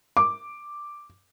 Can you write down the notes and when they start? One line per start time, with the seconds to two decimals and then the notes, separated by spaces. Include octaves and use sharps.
0.17 D6